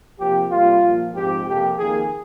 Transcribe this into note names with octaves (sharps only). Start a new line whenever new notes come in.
C3 F3 A#3 G4
C3 G3 A#3 F4
A#2 F3 A#3
G#2 F3 C4 G4
F2 C3 F3 A#3 G4
F2 D#3 A#3 G#4